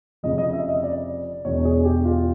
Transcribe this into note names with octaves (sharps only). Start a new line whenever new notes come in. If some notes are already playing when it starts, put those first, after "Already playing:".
F1 F2 C#3 F3 D#5
D#5
E5
D#5
D5
E1 E2 B2 C#5
G#4
G4
F4